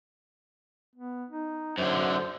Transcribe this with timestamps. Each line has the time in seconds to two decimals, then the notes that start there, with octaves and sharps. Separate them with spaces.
0.95 B3
1.30 D#4
1.78 F#2 D3 C5